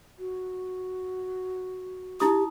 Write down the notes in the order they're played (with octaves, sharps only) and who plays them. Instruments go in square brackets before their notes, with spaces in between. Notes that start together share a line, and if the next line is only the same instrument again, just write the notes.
[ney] F#4
[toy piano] D#4 E4 D#6 [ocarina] G4